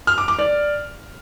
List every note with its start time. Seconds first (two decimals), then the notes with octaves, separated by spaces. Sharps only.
0.07 F6
0.18 D6
0.28 D6
0.39 D5